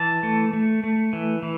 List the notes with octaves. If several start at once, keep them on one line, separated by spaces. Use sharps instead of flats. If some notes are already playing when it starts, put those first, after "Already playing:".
Already playing: E3 A5
A3
A3
A3
E3
E3